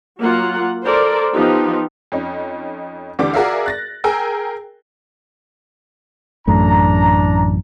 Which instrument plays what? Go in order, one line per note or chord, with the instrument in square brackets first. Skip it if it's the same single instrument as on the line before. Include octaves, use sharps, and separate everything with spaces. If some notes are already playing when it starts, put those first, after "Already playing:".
[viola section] F#3 A#3 F4 F#5
A4 A#4 C5 D5
F3 B3 D#4 F4 G4
[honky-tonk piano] F2 C#4 D#4
D2 D3 E3 D4 G4 D6
F#4 G#4 A#4 D5 E5 F5
F#6 A6 A#6
G#4 A#4 G5 G#5 E6
[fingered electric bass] A1 F#2 A3 [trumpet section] D4 A#5